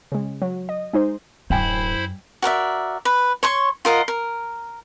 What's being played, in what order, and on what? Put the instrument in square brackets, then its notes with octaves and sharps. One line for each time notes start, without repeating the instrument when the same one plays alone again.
[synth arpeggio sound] C#3 G#3
F#3
D#5
G#3 D#4 C5
[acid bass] D1 [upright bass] F#2 [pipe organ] E4 C5 B5 [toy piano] D5 G5 G#5
[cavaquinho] F#4 A#4 D5 E5
B4
C#5 C6 C#6
F4 A#4 D#5 F#5
A#4